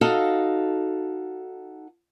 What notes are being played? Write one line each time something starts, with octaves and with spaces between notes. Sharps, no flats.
D#4 F#4 A4 F5